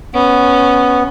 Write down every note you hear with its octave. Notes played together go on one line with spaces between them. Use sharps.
B3 C#4